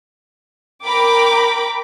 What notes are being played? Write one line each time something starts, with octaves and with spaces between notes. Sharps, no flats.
A#4 G5 B5 D6